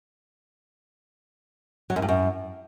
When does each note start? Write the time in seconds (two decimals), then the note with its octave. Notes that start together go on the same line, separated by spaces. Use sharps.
1.90 F#3
1.96 F#2
2.02 G2
2.08 F#2